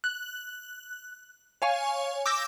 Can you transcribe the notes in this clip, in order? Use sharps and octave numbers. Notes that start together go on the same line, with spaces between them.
F#6
C#5 F5 G#5 C#6
D6 E6 G6 A#6